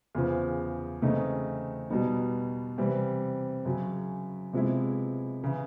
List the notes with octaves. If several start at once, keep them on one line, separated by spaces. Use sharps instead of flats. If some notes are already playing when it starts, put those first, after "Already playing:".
E2 C#3 F3
C#3 E3 A3 C4 D#4
B2 G3 B3 D#4
C3 E3 G3 C4
F#2 C#3 F#3
C3 F3 G#3 B3 E4
C#3 E3